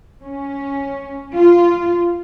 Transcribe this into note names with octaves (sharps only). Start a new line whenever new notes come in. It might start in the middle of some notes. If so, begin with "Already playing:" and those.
C#4
F4